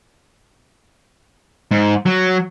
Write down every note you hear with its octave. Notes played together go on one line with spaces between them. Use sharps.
G#2
F#3